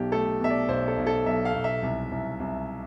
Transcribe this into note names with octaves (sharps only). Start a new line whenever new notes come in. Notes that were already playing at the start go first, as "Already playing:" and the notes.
Already playing: B1 B2 G4
A3 A4
B2 E5
D5
B1 C5
A4
B1
A4
B1 E5
F5
B1
E5
C2
C2
C2